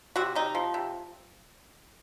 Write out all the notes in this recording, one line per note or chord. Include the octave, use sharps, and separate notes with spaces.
C3 F#4
C3 D#4
F3
C3